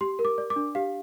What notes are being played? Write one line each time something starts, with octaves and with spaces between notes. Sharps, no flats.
G4 C6
A#4
D6
D5
D6
D4
G4 F5